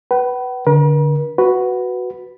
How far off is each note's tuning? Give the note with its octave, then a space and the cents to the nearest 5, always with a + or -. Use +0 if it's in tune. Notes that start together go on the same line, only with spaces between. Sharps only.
B4 -5 F#5 +45
D3 -5 A#4 +45
F#4 +0 B4 +0